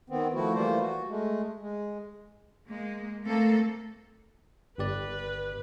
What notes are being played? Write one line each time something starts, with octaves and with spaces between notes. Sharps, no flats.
D#3 B3 C4
F3 A3 E4 F#4
E3 G3 A3 A#3 F4 C5
F#4
G#3 A3
G#3
G#3 A#3
A3 A#3 C4 A4
G1 G4 B4 D5